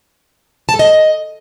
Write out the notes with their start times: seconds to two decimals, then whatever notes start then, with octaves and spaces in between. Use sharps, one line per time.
0.69 A5
0.74 A4
0.79 D#5